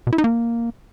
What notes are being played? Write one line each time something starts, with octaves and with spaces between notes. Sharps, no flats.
B2
E4
D#4
A#3